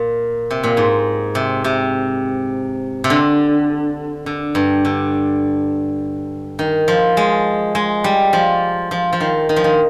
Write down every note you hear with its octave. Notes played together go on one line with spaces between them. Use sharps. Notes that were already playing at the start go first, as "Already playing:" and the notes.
Already playing: A#2
C3
A#2
G#2
C3
C3
C3
D3
D3
G2
D3
D#3
F3
G#3
G#3
G3
F3
F3
F3
D#3
D#3
F3
D#3